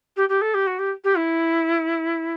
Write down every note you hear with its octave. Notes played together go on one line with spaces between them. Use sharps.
G4
G4
A4
G4
F#4
G4
G4
E4